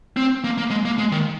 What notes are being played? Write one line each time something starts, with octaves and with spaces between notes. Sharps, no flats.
C4
A#3
A#3
G#3
A#3
G#3
D#3